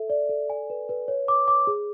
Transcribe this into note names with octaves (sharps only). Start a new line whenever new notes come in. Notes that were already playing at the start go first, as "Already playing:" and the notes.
Already playing: A4 E5
D5
A4
G#5
B4
B4
C#5
D6
D6
G#4